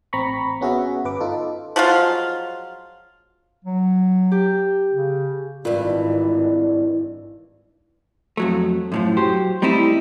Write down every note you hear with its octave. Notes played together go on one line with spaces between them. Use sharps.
A1 C4 A#5 B5 C#6
B3 C#4 F#4 G#4 E5
G1 B4 D6
D#4 F4 A4
F3 F#3 G#3 F4
F#3
G4
C#3
G#1 G2 E3 F4 A#4 D5
F2 F#3 A3
F#2 A2 F3
F#3 G4 C5
G3 A3 C4 D#4 E4 G4